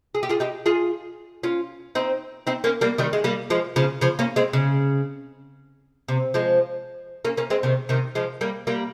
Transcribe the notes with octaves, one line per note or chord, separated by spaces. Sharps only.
G#4
G4
F4 G#4
D#4 G4
F4 G#4
C#4 F4
C4 D#4
C4 D#4
A#3 C#4
G3 A#3
D#3 G3
G#3
G3 A#3
F3 G#3
C#3 F3
C#3 F3
A#3 C#4
G#3 C4
C#3
C3
F3 G#3
A#3 C#4
A#3 C#4
G#3 C4
C3 D#3
C3 D#3
F3 G#3
G3 A#3
G3 A#3